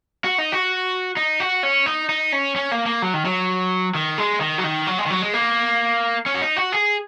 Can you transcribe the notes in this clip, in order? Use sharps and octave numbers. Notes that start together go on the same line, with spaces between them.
F#4
D#4
F#4
D#4
F#4
C#4
D#4
D#4
C#4
C#4
A#3
A#3
F#3
D#3
F#3
D#3
G#3
D#3
F#3
D#3
F#3
G#3
D#3
F#3
G#3
A#3
C#4
F#4
D#4
F#4
G#4